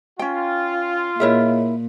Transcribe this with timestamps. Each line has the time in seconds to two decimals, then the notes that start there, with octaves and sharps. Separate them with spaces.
0.19 C#4 F4 G5
1.20 A#2 E4 G#4 A#4 C#5 D#5 E5